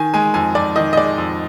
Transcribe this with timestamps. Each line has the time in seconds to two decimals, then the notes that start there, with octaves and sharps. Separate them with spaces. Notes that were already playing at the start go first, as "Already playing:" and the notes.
Already playing: D#3 G#5
0.14 G#3 G#5
0.34 F2 G#5
0.55 F2 D5
0.76 D#3 D#5
0.93 D#5
0.97 G#3 D5
1.18 F2